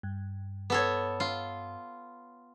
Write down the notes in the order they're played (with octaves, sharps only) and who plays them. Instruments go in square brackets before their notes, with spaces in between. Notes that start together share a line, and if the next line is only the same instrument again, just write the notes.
[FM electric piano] G2
[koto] B3 A4 C#5
F4